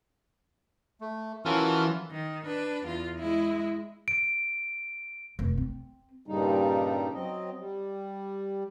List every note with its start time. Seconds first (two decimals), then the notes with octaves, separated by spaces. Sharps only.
1.01 A3
1.45 E3 C#4 F4 F#4 A4 A#4 F6
2.11 D#3
2.46 D4 B4
2.86 E2 F4
3.19 G#3 E4
4.08 D7
5.39 F1
5.58 C4
6.27 G2 A#2 C#3 G3 D#4
7.14 F#3 C4 D#5
7.58 G3